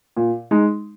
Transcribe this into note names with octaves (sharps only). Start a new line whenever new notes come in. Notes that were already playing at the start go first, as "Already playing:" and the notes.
A#2
G#3 D#4